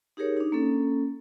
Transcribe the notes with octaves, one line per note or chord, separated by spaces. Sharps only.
D#4 G4 G#4 A#4 C#5
D4 D#4
A#3 C#4 A4